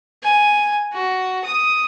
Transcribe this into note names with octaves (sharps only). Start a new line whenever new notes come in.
G#5
F#4
D#6